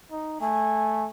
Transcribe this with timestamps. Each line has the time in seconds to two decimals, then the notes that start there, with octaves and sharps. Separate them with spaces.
0.11 D#4
0.41 A3 G#5